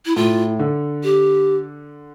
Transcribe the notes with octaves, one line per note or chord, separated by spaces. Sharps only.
E4
A2 F4
D3
G4